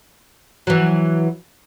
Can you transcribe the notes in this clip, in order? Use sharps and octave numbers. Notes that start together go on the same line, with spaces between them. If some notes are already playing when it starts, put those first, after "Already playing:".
E3 F#3